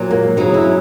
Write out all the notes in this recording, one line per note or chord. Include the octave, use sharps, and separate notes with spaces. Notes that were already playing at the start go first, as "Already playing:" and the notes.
Already playing: A#2 F#3
A#3
C#3 F#3 D#4
E4